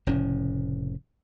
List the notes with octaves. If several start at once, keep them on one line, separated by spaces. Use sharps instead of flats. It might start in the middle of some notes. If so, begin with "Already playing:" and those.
F1 A2 C#3 C#4